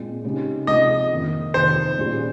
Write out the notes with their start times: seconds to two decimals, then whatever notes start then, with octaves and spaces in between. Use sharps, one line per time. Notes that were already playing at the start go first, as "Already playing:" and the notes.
Already playing: A#2 G#3 C4
0.24 C#3 G#3 D#4 G4
0.67 C3 F3 G#3 C4 D#5
1.11 F2 D#3 A#3 D#4
1.54 F2 C3 D#3 C5
1.98 A#2 G3 C#4 G#4